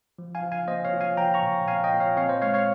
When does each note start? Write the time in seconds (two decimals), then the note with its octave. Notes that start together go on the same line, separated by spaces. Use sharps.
0.19 F3
0.35 F5 G#5
0.42 F3
0.52 F5 G#5
0.67 A#3 C5 D#5
0.85 C#5 F5
0.93 F4
1.00 F5 G#5
1.17 F3 G5 A#5
1.34 A#5 C#6
1.42 A#2
1.68 A#2 F5 G#5
1.84 D#5 G5
1.93 A#2
2.00 C#5 F5
2.17 C4 C#5 F5
2.29 C5 D#5
2.42 G#3 C#5 F5
2.54 C#5 F5